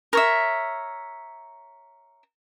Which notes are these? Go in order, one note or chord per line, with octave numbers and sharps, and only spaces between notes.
A#4 C#5 E5